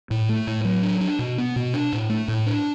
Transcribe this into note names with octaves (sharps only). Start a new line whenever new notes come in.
A2
A3
A2
F#3
D4
D4
B2
B3
B2
D4
A2
A3
A2
D4